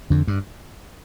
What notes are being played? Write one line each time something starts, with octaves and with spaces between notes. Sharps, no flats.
F2 D3
G2